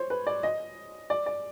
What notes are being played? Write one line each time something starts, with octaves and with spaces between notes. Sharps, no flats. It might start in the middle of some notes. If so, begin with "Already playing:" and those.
Already playing: C5 C#5
B4
D5
D#5
D5
D5